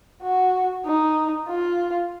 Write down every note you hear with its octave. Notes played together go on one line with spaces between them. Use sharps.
F#4
D#4
F4